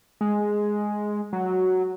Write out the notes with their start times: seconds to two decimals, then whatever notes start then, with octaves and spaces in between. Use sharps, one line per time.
0.21 G#3
1.33 F#3